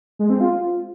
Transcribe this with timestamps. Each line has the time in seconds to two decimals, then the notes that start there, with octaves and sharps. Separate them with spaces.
0.19 G#3
0.30 C4
0.40 F4